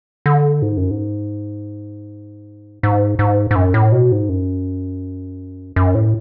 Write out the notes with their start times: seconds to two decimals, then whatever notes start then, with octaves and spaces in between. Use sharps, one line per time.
0.26 D3
0.62 G#2
0.77 F#2
0.91 G#2
2.83 G#2
3.19 G#2
3.51 G#2
3.56 F#2
3.74 A2
3.92 B2
4.12 G#2
4.29 F#2
5.76 F#2
5.95 A2